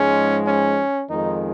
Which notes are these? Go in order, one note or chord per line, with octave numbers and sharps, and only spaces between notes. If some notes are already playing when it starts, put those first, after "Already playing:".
Already playing: G#2 F3 G#3 C#4
C#4
F2 D#3 G#3 D#4